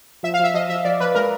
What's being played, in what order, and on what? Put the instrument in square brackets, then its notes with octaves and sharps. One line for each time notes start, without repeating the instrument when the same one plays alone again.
[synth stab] F3 E5
F5
F3 E5
F3 D#5
F3 E5
F3 D5
F3 B4
G#3 A#4